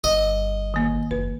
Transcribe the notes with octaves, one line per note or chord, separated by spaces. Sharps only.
G1 D#5
D#3 A#3
F#1 B4